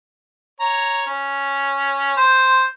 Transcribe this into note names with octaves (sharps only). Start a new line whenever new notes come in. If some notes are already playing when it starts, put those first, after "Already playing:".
C#5 A#5
C#4
C5